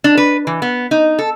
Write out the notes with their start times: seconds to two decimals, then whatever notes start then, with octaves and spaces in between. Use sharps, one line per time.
0.04 D4
0.17 B4
0.47 E3
0.62 B3
0.91 D#4
1.19 A4